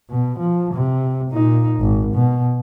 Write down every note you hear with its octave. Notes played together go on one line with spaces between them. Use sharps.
B2
F3
C3
A#2 D#4
G#1
B2